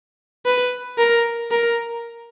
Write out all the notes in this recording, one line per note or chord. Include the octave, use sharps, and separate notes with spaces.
B4
A#4
A#4